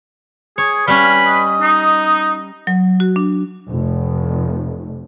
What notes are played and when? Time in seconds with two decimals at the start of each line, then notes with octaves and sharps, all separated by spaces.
0.58 G#4 C#5
0.88 G3 C#4 B4 F5
1.27 D#5
1.61 D#4
2.67 F#3
3.00 F#4
3.16 D4
3.71 F1